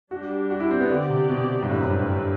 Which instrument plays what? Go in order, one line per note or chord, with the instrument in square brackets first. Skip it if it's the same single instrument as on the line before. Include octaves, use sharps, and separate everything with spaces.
[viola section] G3 D4 G4 [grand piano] F#4
[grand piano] F#4
E4
C4
B3
[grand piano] D3 [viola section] C4 G4 D5
[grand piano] C3
B2
G2
[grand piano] A2 [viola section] D3 A3 C4 G4 B4
[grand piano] F#2
G2
A2